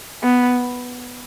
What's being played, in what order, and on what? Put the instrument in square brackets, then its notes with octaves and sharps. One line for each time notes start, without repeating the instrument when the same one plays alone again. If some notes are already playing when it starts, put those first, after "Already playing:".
[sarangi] B3